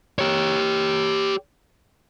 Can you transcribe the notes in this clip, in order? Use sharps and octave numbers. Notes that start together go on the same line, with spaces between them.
G4 C#5